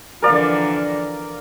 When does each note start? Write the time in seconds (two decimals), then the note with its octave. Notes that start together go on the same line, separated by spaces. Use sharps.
0.22 D3 E3 F3 A#4 D5 F5